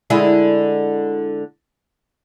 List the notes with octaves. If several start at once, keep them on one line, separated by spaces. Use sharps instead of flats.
D3 G#3 E4